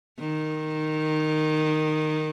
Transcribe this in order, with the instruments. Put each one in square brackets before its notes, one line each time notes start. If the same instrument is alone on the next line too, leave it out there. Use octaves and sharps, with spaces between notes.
[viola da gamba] D#3